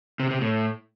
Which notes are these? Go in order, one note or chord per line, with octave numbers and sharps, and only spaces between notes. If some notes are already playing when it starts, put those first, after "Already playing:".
C3
C3
A2